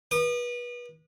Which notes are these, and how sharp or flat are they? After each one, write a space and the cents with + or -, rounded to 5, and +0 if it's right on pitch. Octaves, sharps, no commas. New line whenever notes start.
B4 -30 D#6 -40